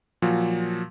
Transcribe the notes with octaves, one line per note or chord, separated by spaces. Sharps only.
A#2 F3 F#3